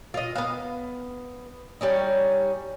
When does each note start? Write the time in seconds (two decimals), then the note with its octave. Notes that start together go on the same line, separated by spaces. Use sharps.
0.14 F4 D#5
0.36 B3 F5
1.81 G3 C#4 D#4